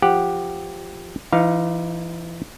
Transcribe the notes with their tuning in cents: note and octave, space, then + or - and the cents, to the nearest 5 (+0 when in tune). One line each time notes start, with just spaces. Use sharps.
F3 +0 G4 +0 F#5 +0
E3 +35 D#4 +10 F5 +0